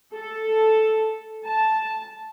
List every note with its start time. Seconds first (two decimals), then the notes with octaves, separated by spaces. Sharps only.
0.12 A4
1.45 A5